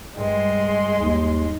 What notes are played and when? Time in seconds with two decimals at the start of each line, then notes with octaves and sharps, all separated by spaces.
0.17 G2 G#3 C6
0.64 G#4
1.00 D#2 D#4